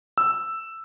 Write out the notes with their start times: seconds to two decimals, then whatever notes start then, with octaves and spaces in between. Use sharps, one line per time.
0.18 E6